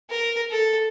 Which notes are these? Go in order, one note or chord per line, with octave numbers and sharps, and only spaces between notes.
A#4
A4